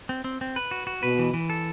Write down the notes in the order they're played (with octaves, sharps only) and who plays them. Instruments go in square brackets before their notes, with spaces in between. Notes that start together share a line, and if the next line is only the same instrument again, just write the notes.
[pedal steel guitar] C4
C4
C4
B4
F#4
F#4
[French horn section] B2 [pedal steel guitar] B4
[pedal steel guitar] E3
E3
A4